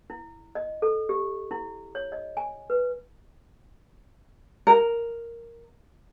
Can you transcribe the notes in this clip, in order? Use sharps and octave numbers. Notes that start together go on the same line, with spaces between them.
E4
D#5
A4
G4
E4
C#5
D#5
G#5
B4
A#4